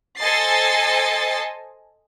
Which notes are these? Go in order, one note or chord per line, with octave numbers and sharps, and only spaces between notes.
A4 C5 D#5 G#5 A6 C7